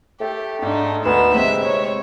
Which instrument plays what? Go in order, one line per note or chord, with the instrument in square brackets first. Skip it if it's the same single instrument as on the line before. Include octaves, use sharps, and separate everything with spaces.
[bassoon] A3 [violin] G4
[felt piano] G#2 [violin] D4 D#4
[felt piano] D2 [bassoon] B3 [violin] D#4 E7
[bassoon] C3 [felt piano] G#3 C4 [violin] E5
[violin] C#5